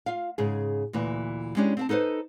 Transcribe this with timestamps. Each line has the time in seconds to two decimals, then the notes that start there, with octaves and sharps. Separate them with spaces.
0.06 F4 F5
0.38 G#2 C#3 G#4
0.93 D2 A#2 E3
1.56 G#3 C#4 D4 E4 G4
1.77 C4 E5 A5
1.89 D#4 A4 B4 C5 D#5